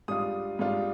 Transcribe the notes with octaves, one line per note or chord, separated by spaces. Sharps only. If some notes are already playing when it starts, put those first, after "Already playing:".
G#2 G3 D4 F4 D#6
G#2 G3 D4 F4